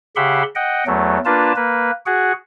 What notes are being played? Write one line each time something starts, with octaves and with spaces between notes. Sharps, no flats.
C#3 G4 E5 F#5 B5 C6
D#5 F#5 G5
E2 F#3 A3
A#3 D4 F4 B4 A5
A#3 B4
F#4 G#4 F#5